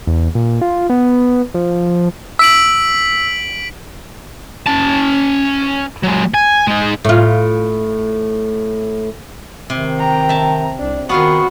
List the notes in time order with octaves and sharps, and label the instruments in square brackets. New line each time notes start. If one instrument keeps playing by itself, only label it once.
[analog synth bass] E2
A#2
F4
B3
F3
[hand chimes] E6 [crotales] B6 D7 F#7
[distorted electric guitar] C#4 A5
F#3 G#3
G#5
G#3 D#4
[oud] A2 F4
[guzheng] C3 [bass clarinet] D#3
[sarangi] G5 [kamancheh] A#5
[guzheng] E5 A5
[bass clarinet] C2 [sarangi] D4
[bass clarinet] D#3 [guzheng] B3 F4 G#4 [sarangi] F#4 [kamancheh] C#6